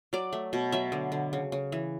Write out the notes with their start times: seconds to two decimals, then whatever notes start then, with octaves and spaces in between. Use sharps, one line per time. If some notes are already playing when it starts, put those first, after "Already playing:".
0.13 F#3 D5
0.33 A3
0.53 B2
0.72 F#3 E5
0.92 D3
1.12 D3
1.33 C#3
1.52 C#3
1.72 E3